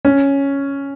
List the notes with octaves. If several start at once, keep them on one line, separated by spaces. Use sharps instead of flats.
C#4